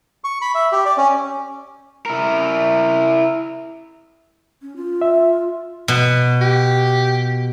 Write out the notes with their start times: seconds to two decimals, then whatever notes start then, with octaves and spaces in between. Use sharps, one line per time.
0.24 C#6
0.41 B5
0.55 E5
0.72 G4
0.85 D5
0.97 C#4
2.06 E4 A#4
4.62 C#4
4.76 F4
5.01 E5
5.88 B2
6.41 G4